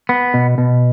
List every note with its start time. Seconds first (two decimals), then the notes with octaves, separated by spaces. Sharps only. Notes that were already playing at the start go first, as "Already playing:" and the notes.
0.09 B3
0.34 B2
0.58 B2